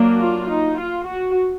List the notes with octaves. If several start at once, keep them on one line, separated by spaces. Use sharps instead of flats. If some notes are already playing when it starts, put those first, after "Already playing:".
Already playing: F#3 A#3 D4
F4
D#4
F4
F#4